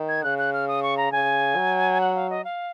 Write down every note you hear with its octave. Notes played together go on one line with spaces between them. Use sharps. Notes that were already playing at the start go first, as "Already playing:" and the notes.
Already playing: D#3
G#6
C#3 F#6
F#6
F6
D#6
C#6
A#5
C#3 G#5
F#3
F#5
F5
D#5
F5